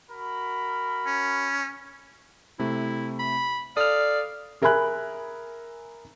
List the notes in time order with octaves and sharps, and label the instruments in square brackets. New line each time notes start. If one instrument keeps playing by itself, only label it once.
[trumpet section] F#4 A#4 B5
[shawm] C#4
[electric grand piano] C3 A3 [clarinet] E4
[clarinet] B5
[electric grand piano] A4 [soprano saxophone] D5 [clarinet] F5 [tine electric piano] D#6 F6
[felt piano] G#4 A#4 E5 G#5 B5 F#6